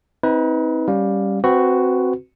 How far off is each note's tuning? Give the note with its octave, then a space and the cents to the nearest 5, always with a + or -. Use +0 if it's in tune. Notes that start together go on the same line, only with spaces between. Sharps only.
C4 +0 D#4 +40 B4 +0
G3 +0 C#4 +0 F5 +20
C4 +0 F#4 +0 B4 +15